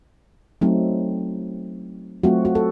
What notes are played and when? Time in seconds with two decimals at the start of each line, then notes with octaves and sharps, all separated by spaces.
0.61 F#3 A3 C4 D#4
2.23 F#3 A3 C4 F4 F#4
2.45 F#4
2.55 A4